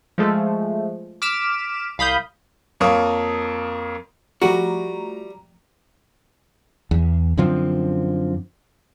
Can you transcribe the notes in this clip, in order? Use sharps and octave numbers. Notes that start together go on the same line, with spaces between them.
F3 G#3 A3
D6 F6 B6 D7 E7
C2 F5 B5 D#6 G6
F2 A#3 C#5 D#6
F3 G3 A3 F#4 A#5
E2
F#2 D3 F3 C4